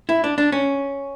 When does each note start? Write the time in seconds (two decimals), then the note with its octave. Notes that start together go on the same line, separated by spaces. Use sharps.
0.09 E4
0.24 D4
0.38 D4
0.52 C#4